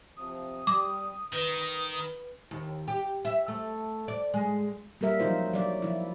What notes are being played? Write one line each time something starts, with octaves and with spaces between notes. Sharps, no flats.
C3 F3 D#6
G3 D6
D#3 B4
D#2
G4
E5
A3
D5
G#3
G3 A#3 A#4 E5
F3 F#3 D#4 F4 C5
F#3 D5
F3 E4